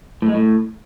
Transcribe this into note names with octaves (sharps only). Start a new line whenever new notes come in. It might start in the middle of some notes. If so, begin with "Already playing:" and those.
A2
G#3
A2